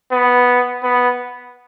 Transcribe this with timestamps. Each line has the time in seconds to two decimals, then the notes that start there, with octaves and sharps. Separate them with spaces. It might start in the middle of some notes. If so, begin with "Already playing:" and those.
0.12 B3
0.83 B3